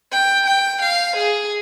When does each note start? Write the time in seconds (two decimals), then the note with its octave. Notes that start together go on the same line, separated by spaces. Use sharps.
0.12 G5
0.47 G5
0.82 F5
1.17 G#4